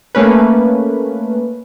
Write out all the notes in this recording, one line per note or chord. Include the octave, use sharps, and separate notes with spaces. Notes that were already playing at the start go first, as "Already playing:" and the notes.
A3 A#3 C#4 B4